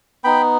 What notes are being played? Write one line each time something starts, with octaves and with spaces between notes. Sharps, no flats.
B3 D#4 G5 B5